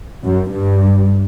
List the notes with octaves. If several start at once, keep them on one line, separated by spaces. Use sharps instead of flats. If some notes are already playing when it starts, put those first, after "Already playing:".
F#2
G2